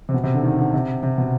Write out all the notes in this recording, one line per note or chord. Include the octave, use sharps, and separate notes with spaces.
C3
B2
C3
D3
D#3
D3
C3
C3
B2